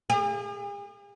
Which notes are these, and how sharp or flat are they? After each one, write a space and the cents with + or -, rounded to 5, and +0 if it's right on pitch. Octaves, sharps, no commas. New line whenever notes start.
G#4 -45